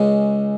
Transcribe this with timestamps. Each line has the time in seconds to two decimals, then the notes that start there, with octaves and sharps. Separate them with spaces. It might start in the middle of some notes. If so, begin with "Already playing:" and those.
Already playing: C#2 C#3 G#3